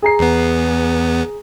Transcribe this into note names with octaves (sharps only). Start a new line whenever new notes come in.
G#4 A#5 C7
E2 B3